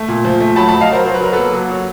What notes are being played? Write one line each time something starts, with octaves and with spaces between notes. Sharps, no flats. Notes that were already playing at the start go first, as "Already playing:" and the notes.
Already playing: A3
A#2
F3
A3
F#3 A5 B5
A5 B5
F#3
D#5 F5
F#3 A#4 C5
F#3 C5
B4
F#3 A#4
A#3 A4 B4
F#3
F#3